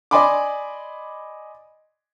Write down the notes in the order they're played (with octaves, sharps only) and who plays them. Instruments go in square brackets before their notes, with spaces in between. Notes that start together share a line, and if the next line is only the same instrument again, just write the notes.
[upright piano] D5 D#5 G#5 B5 C6 D6